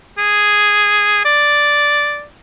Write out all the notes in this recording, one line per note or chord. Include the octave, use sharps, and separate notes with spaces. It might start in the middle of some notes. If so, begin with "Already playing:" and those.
G#4
D5